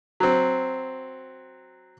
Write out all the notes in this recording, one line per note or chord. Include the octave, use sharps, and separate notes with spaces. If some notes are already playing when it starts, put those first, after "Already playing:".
F#3 C4